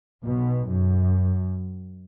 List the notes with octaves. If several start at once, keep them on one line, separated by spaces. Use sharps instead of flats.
B1 B2
F#2